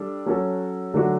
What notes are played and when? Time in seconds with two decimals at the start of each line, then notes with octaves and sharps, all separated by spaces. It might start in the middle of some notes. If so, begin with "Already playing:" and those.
Already playing: G3 D4 A4
0.26 F#3 C#4 F#4 A4
0.94 D3 F#3 A3 D4 F#4